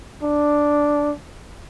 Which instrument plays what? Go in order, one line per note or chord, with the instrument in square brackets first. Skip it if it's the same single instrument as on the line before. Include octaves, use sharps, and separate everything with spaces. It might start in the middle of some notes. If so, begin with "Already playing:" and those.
[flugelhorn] D4